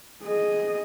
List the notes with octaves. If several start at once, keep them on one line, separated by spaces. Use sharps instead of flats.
G#4 D#5